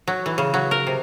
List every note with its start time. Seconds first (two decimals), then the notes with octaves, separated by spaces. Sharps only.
0.08 F#3
0.26 E3
0.38 C#3
0.54 F#3
0.71 A#4
0.87 C3